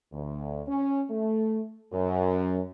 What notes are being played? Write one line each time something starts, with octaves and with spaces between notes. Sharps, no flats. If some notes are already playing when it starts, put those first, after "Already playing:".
D2
C#4
A3
F#2